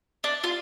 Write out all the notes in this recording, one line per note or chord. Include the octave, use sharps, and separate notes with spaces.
D4
F4